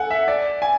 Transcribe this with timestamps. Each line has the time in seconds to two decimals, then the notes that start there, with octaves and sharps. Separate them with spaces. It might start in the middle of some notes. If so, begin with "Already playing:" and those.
Already playing: A4 F#5 G#5
0.11 E5
0.28 D5
0.62 G#5